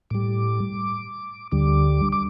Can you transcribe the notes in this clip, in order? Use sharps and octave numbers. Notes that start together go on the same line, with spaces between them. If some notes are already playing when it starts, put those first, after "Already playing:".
A2 G3 D6
D2 D3 G3 D6
D6